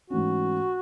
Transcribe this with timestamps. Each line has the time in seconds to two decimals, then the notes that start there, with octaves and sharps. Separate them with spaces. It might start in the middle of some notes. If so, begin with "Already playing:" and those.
0.10 G#2 E3 A3 C#4 F#4